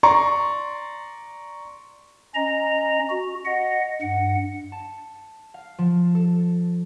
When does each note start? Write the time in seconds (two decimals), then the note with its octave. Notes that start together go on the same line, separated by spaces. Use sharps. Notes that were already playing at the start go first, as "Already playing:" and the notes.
0.03 D5 A#5 C6 C#6
2.35 C#4 D#5 A#5
3.09 F#4
3.45 D#5 F#5
4.01 G2 F#5
4.72 A5
5.54 F5
5.79 F3
6.15 A4